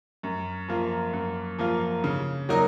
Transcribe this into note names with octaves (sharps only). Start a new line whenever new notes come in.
F#2
F3 A#3 F4
F#2
F3 A#3 F4
C#3
F#3 A#3 D#4 A#4